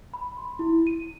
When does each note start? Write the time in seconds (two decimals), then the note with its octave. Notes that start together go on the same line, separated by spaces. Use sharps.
0.14 B5
0.37 C6
0.59 E4
0.87 D#7